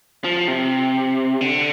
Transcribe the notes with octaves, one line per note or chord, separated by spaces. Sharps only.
F3
C3
D3